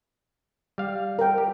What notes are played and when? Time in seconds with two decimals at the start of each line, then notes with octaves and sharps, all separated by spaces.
0.78 G3 F5
1.19 A#4 G5
1.38 G4